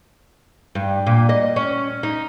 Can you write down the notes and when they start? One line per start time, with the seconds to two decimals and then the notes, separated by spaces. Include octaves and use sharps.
0.75 G2
1.07 A#2
1.29 D#5
1.56 C#4
2.03 D#4